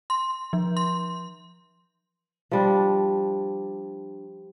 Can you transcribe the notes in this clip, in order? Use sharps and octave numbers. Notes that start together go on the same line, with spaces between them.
C6
F3
C6
F3 G3 D4